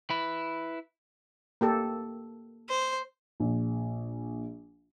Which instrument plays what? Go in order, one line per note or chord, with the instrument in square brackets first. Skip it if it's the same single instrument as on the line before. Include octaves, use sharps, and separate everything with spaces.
[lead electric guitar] E4 B4
[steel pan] A#3 G4 A4
[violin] C5
[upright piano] A#1